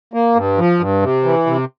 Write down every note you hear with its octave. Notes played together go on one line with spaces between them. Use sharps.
A#3
G2
F3
G2
C3
E3
C3